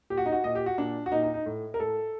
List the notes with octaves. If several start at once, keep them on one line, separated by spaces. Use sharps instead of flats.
A#2 G4
F#4
D#4
F#4
A#2 D#5
G4
F#4
A#2 D4
F#4
A#2 D#4
D#4
D#4
A2
A#4
A2 A4